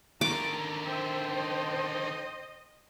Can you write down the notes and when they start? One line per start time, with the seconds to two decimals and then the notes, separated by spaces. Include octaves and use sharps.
0.21 D3 D#3 A#5 D6
0.85 C5 E5 G5
1.38 D#5